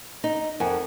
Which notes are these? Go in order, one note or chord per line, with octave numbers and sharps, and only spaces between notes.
D#4
F2 A#4 F#5 G#5